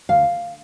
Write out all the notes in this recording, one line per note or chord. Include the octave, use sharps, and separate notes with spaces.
D2 F5